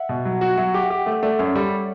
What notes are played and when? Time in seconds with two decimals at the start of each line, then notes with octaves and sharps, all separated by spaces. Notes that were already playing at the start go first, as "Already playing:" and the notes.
Already playing: E5 F#5
0.09 B2
0.25 F#3
0.41 F#4
0.57 F#3 E5
0.74 G4
0.82 F#5
0.90 G4
1.06 A3
1.12 E5
1.22 A3 D5
1.39 F#2 C#5
1.55 G3 A4